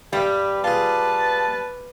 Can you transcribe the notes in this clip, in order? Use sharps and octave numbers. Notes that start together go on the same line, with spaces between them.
G2 G3 G4 B4
F4 G#4 B4 A5